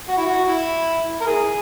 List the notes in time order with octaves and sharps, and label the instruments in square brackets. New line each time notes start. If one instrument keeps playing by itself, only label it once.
[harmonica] F#4
E4
F#4
E4
A#4
E4 G#4